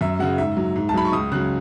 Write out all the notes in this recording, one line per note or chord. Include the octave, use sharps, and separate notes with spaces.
F#2 E5
C#3 F#3 F#5
G#2 E5
F#3
G#2
A5
F#3 B5
C#6
C#2 D#6
C#3 F#3 F#6